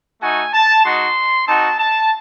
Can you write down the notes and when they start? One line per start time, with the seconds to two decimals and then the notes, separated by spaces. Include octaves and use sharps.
0.22 A3 D#4 F#4 G#5
0.53 A5
0.85 G#3 D#4 F#4 C6
1.48 C4 D#4 F#4 A5
1.79 A5